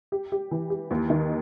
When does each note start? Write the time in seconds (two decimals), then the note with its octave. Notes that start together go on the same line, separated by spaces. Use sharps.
0.12 G4
0.32 G4
0.51 E3
0.70 G4
0.91 D#2
1.10 D#3